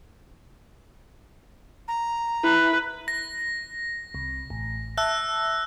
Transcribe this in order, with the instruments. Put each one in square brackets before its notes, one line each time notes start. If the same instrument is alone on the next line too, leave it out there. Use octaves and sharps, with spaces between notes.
[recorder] A#5
[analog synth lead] E4 [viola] B4
[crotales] A#6
[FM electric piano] C2
A1
[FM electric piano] E5 A5 [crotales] E6 F#6